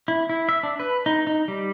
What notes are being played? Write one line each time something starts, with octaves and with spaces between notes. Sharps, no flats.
E4
E4
E5
D4
B4
D#4
D#4
G3